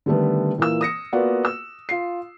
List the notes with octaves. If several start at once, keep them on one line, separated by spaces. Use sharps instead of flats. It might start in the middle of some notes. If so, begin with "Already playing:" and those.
D3 D#3 G3 A3 B3
A#2 E3 A#3 E6
D#6 A#6 C#7
A#3 B3 F4 F#4 D5 F#5
E6
F4 C7